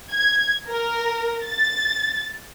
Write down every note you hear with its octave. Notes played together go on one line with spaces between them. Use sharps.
G#6
A#4
A6